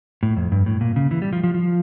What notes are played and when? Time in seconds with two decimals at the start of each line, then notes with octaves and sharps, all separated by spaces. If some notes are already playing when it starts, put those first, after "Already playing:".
0.23 A2
0.37 F2
0.52 G2
0.66 A2
0.81 A#2
0.96 C#3
1.11 E3
1.22 G3
1.33 F3
1.44 F3
1.54 F3